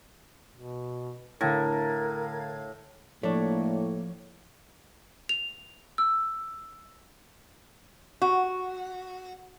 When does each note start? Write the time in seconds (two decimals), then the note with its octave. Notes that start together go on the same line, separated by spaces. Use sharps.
0.54 B2
1.41 A2 D3 A#4 F5 G#6
3.23 A2 F3 A3 A#3 D4 C#5
5.29 F7
5.98 E6
8.22 F#4